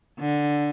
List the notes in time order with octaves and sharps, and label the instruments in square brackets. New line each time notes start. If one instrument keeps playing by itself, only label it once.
[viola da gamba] D3